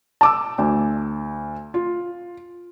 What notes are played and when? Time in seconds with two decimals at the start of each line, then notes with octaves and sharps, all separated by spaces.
0.21 A5 D6 E6
0.58 D2
1.74 F4